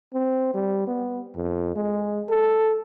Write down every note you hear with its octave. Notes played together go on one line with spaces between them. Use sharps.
C4
G3
B3
F2
G#3
A4